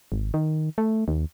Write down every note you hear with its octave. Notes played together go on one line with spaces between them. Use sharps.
G#1
D#3
A3
D#2